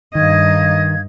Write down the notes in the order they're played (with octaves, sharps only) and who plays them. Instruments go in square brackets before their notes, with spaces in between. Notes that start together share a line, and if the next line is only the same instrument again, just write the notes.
[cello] G2 D#5 [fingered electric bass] D#3 [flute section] D#4 F5 G#6